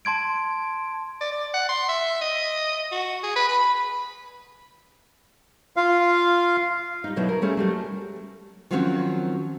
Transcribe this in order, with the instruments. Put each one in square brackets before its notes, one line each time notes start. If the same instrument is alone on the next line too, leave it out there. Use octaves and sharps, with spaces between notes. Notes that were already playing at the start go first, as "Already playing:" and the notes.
[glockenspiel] A5 C6 G#6 D7
[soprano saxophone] D5
D5
F#5
C6
E5
D#5
F#4
G#4
B4
B5
[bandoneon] F4 F5
[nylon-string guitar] G3 D#4
B2 D3 F#3 B3 D#4 E4
A#4
G3 A3 C#4 G#4
F#3 G3 A3
D#3 F3 F#3 C4 C#4 F#4